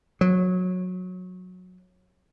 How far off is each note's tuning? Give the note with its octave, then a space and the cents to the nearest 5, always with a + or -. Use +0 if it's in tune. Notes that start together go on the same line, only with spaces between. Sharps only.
F#3 -20